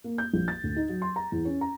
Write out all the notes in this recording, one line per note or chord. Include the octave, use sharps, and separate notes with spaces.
A#3
G6
A#1
A6
D2
D#4
F#3
C6
A#5
E2
C#4
A#5